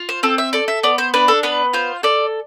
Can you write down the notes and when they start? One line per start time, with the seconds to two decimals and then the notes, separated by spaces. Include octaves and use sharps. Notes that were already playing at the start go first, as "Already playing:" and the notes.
Already playing: F4
0.09 C5
0.23 C4 A4
0.38 E5
0.53 A4 D5
0.68 E5
0.83 B3 D5
0.98 C5
1.14 D4 B4
1.28 A4
1.43 B3 B4
1.73 F4 C5
2.03 A4 D5